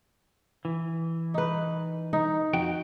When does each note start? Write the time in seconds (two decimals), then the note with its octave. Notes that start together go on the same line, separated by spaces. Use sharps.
0.65 E3
1.34 D#4 B4
2.13 D#4
2.53 F2 F#4 G5